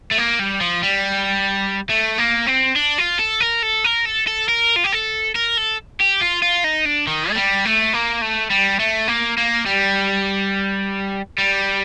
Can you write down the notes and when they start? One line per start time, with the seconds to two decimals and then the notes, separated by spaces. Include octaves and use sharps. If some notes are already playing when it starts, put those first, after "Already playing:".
0.11 A3
0.18 A#3
0.40 G3
0.61 F3
0.83 G3
1.90 A3
2.19 A#3
2.47 C4
2.76 D4
2.98 F4
3.19 A4
3.41 A#4
3.63 A4
3.84 A#4
4.05 A4
4.28 A4
4.49 A#4
4.76 F4
4.84 G4
4.92 A4
5.35 A#4
5.57 A4
6.00 G4
6.21 F4
6.42 F4
6.64 D#4
6.85 D4
7.07 D#3
7.31 A3
7.36 G3
7.65 A3
7.93 A#3
8.22 A3
8.50 G3
8.80 A3
9.08 A#3
9.37 A#3
9.66 G3
11.38 G3